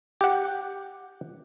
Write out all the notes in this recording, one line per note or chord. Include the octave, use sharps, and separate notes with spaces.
G4 F#5